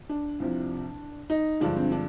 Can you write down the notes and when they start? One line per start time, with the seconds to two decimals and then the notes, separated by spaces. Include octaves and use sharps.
0.09 D4
0.40 C2 C3 F3
1.30 D#4
1.60 G2 D3 F3 G#3 D4
1.76 C4
1.92 D4